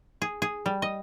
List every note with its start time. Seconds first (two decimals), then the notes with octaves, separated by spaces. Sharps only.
0.22 G#4
0.42 G#4
0.66 G3
0.82 D#5